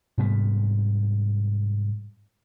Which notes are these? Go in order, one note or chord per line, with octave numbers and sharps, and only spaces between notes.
G#2 C3 G3 B3